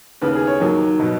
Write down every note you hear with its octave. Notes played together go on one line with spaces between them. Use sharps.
D#2 C#3 B3 B4
G#4
C#5
D#2 D#3 F#3
B2 F#3 B3